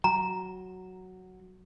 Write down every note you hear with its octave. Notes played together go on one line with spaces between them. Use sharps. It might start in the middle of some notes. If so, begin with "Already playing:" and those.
F#3 A#5